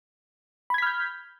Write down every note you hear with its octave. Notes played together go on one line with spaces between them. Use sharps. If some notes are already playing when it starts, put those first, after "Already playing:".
B5 F6 G6 G#6 B6